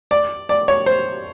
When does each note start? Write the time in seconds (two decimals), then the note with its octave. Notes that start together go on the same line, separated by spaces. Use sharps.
0.11 D5
0.49 D5
0.68 C#5
0.86 C5